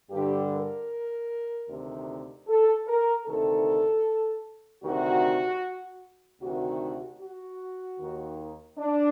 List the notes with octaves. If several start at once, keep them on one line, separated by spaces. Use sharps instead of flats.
G2 D3 G4
A#4
D2 C3 D#3
A4
A#4
D2 C3 D#3 A4
D2 C3 D#3 F#4
D2 C3 D#3 F#4
F#4
D#2 D#3
D4